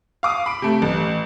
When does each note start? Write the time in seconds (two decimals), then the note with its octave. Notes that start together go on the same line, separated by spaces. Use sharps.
0.23 F5 D6 D#6
0.46 B5 D7
0.62 C3 A3
0.82 A1